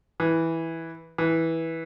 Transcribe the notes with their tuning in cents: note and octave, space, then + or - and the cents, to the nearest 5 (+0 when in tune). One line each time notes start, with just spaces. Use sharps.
E3 -10
E3 -15